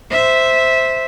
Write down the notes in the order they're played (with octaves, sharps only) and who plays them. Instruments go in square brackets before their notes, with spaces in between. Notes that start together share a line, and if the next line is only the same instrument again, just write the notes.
[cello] C5 E5